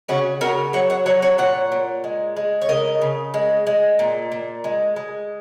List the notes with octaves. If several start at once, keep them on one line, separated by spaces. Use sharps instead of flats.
C#3 C#4 F#4
C#3 F#4 A#4
F#3 C#5 F#5
C#5 F#5
F#3 C#5 F#5
C#5 F#5
A#2 C#5 F#5
A#2
G#3
G#3
C#5
C#3 A#4 D#5
C#3
G#3
G#3
A#2
A#2
G#3
G#3